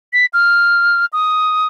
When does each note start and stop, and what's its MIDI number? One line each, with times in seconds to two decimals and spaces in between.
0.13 0.26 95
0.33 1.05 89
1.13 1.68 87